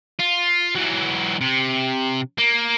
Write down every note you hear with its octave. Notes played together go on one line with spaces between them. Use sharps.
F4
E3 F#3
C3
A#3